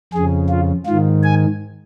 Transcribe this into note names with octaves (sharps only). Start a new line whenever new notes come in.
F2 C#3 G#4
F4
G#2 D#3 F4
G#5